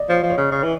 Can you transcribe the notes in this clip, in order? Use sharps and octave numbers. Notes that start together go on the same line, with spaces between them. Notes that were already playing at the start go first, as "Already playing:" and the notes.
Already playing: D5 D#5
F3 C#5
F3
C#5
C#3
C#3
E3